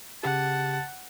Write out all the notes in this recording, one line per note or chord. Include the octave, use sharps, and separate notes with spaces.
C#3 G4 F#5 A5